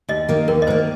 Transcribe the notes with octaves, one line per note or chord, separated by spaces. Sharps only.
D#2 D#5
D#3 A#3
D#2 A#4
D#5
D#3 A#3 C5